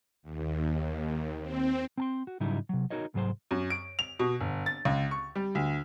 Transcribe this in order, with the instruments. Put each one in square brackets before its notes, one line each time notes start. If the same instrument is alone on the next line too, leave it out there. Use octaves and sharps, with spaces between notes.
[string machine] D#2
C4
[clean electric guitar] C4 A5 C6
F#4
G#2 C#3 F#3 G3 D#4 E4
C3 F#3
D#4 F#4 A#4 C#5 D#5
C2 G#2 F#3 G#4 C5 C6
[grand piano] F#2
D7
F7
B2
G1
A6
C#2
C#6
G3
D2